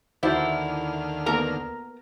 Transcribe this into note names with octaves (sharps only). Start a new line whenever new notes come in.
D#2 D3 E4 F#4 C5 D5 F#5 F6
A#3 B3 A4 A#4 A#5